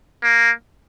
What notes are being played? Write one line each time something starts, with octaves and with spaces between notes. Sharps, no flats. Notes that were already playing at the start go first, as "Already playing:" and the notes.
A#3